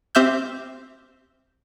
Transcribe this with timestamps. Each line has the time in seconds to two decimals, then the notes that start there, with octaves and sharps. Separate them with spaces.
0.15 C4 G4 E5 F6 G6